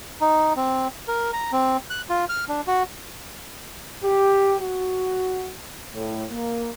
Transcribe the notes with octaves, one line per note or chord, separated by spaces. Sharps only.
D#4
C4
A#4
A#5
C4
F#6
F4
F6
D4
F#4
G4
F#4
A2
A#3